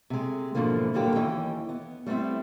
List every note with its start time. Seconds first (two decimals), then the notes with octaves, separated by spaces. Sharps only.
0.10 C3 G#3
0.55 G#2 B2 D3 E3 F3 A#3
0.94 G2 A#2 D3 F#3 A#3 G4
1.15 D#2 E3 C#4 D#5 G5
1.69 B3
2.06 G3 A3 B3 C4 E4